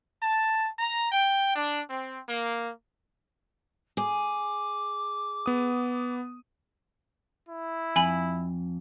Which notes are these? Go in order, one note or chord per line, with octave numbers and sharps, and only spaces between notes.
A5
A#5
G5
D4
C4
A#3
G#4 D6
B3 D#6
E4
F2 G#5 B5